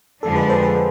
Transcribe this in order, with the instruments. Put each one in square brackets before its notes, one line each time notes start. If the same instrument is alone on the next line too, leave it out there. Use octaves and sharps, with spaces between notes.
[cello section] F2 D3 F3 G#3 D4 [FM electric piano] A4
[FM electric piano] G#4 B4
A4 C5
G#4 B4